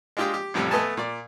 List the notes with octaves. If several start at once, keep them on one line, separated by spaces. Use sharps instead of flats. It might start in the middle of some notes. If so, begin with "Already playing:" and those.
G#3 D4 F4 G4 D#5 G5
G4
A1 F2 A2 C3 F3 G3
A3 B3 D#5 G#5 A5
A#2 D5